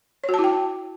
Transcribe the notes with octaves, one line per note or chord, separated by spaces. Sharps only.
C#5
F#4
A5
E4
G5